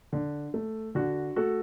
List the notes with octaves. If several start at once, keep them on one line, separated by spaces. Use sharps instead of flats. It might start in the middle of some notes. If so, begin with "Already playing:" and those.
D3
A3
D3 F#4
A3 F#4 A4